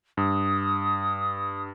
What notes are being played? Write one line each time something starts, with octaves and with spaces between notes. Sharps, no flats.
G2 D#6